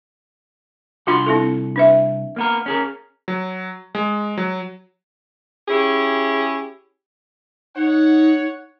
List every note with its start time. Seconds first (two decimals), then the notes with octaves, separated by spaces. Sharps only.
1.07 C2 D4 F4 F#4 F#5 C6
1.26 C4 E4 A4
1.76 D4 B4 E5
2.36 A#3 B3 A#4
2.66 C#4 G#4 A#4
3.28 F#3
3.95 G#3
4.37 F#3
5.68 C#4 E4 G4 G#4
7.76 D#4 C#5 F#5